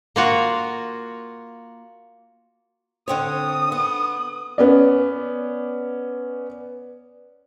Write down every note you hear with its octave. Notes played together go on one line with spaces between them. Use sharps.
A#3 F4 F#4
D3 C4 C#5 D#6
B3
B3 C#4 D5